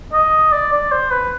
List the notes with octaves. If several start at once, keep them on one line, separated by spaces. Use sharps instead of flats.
D#5
D5
D5
C5
B4